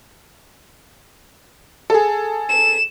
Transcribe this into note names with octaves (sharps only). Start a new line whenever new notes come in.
G#4 A4
E7